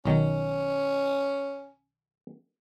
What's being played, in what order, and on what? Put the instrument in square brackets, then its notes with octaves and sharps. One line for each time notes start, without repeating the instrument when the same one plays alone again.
[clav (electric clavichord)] B1 D#3 [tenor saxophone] C#4